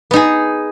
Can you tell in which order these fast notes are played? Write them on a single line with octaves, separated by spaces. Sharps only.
B3 D#4 G#4